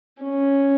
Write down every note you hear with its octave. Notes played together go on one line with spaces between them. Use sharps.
C#4